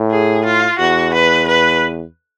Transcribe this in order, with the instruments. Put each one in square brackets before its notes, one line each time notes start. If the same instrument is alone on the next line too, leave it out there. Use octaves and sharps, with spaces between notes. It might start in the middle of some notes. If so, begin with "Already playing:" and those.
Already playing: [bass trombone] A2
[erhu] G#4
F4
[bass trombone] E2 [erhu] F#4
[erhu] B4
B4